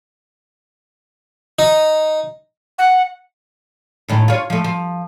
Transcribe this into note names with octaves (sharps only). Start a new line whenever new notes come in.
D#4
F#5
F#2 A2 D#3
F4 C#5
F3 A3
F3